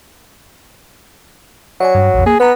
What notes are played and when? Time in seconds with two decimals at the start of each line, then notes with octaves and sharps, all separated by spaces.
1.80 F#3 C#5 D5 G#5
1.95 G2
2.14 A#1 F2
2.26 A#3 G#4
2.40 B3 B4 A#5